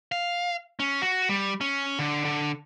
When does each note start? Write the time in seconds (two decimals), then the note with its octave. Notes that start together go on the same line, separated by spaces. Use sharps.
0.12 F5
0.80 C#4
1.02 F#4
1.29 G3
1.61 C#4
1.99 D3
2.25 D3